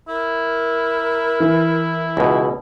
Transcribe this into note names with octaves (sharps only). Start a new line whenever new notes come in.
E4 A#4
E3
C#2 B2